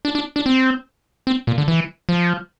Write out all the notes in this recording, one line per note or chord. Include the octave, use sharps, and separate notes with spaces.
D4
D4
D4
C4
C4
A#2
D3
E3
F3